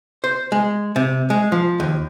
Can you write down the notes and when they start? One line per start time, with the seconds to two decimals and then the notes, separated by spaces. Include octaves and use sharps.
0.24 C5
0.52 G#3
0.96 C3
1.30 G#3
1.52 F3
1.80 D#2